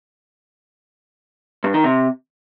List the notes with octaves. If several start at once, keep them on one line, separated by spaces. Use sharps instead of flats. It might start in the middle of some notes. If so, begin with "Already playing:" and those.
G2
D#3
C3